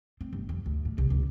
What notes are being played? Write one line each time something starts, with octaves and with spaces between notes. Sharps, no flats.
C4
G1
F2
D2
A2
C2
C#2